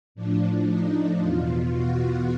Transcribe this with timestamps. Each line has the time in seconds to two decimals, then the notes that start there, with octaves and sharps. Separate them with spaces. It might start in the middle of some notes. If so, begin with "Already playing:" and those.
0.15 A2 F3 D4
0.67 D#4
1.19 E2 B2 F4
1.71 F#4